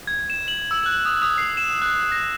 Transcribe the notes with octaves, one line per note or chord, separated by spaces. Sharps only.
G#6
E7
F#7
E6
F#6
D#6
D#6
C7
E7
F#6
A#6